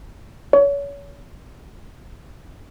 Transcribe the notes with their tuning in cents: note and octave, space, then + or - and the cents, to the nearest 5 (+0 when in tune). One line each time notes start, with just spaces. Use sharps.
C#5 +30